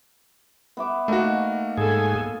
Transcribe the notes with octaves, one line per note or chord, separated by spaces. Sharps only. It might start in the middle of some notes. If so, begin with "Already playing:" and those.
B3 E5 D6
A3 A#3 D#4 F#4 A#4
G#2 B3 G#4 A4 G#5